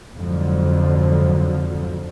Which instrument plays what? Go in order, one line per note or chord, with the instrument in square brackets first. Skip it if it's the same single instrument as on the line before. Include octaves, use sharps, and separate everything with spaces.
[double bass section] F2 G#2 D3 F3 F#3